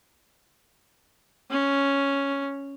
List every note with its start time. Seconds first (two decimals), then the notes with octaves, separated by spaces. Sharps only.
1.50 C#4